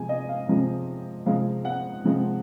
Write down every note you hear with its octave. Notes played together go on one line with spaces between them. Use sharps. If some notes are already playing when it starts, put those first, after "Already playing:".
Already playing: C3 F3 G#3 C4 G#5
D#5
F5
C3 F3 G#3 C4
C3 F3 G#3 C4 F5
F#5
C3 F3 G#3 C4